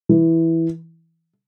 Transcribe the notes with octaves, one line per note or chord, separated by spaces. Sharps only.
E3